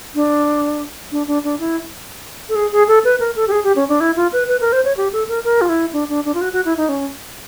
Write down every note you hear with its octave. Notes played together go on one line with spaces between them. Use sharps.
D4
D4
D4
D4
E4
A4
G#4
G#4
A4
B4
A#4
A4
G4
G#4
G4
C#4
D4
E4
F4
B4
B4
A#4
C5
C#5
G4
A4
A#4
A#4
F4
E4
D4
D4
D4
F4
F#4
F#4
E4
D#4
C#4